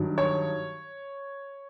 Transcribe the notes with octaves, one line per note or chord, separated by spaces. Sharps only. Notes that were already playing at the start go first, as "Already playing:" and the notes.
Already playing: G2 D#3 F#3
C#5